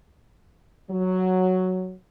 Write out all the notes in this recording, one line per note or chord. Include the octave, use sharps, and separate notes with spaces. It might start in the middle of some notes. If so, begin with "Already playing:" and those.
F#3